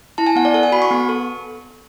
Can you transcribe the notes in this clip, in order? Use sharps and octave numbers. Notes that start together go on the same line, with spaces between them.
E4 A5
G#5
B3 F#5
D5
A4 F#5
G#5
F#4 B5
C#6
B3
A4